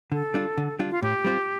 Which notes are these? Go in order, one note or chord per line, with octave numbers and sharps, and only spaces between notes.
D3 A4
G3 D4 F4
D3
G3 D4 F4
F4
A2 G4
G3 C4 F4 C5